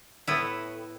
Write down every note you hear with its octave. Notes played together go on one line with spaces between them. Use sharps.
A2 B3 E4